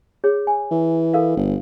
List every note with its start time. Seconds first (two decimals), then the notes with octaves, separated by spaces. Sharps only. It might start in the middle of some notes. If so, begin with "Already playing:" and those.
0.24 G#4 C#5
0.47 G#5
0.71 E3
1.14 A4 A#4 F5
1.37 G1